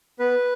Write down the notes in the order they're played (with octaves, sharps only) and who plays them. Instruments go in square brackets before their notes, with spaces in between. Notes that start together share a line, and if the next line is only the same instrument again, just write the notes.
[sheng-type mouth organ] B3 B4